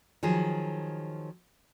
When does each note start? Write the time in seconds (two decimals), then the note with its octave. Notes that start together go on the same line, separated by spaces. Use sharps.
0.23 D#3 F3 F#3 G#4